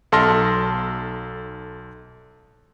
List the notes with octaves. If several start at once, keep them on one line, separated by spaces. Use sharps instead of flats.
B1 A4 A5 C6 F6 A#6